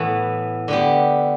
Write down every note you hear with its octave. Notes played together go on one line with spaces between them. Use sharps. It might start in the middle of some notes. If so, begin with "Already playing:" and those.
Already playing: A2 E3 B3
D3 B3 G4